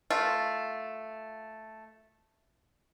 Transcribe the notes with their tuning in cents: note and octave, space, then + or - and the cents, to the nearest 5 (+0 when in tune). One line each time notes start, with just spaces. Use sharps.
A3 +0 F4 +0